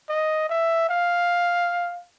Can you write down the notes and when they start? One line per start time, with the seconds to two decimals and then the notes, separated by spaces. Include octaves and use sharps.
0.09 D#5
0.50 E5
0.90 F5